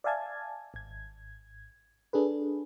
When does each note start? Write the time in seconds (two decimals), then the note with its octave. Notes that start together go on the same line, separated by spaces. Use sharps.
0.04 D5 E5 F5 G#5 A5 G#6
0.74 G#1 G#6
2.13 D4 G#4 A4 B4